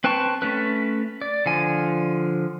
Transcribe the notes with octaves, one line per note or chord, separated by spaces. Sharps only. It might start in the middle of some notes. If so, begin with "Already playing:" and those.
C4 B4 G5 A5 C#6
A3 C#4 B4
D5
D3 F3 G#5